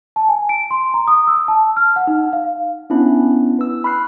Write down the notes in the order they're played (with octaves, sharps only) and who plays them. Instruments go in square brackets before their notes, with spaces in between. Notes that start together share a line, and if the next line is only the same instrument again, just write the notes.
[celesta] A5
G#5
D7
C6
A#5
D#6
E6
A5
F6
F#5
D#4
F5
[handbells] B3 C#4 D4 E4
B4 E6
B5 C#6 F6 F#6 C7